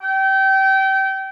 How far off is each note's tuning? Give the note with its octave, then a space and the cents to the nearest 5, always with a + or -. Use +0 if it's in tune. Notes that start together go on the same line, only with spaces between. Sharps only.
G5 -25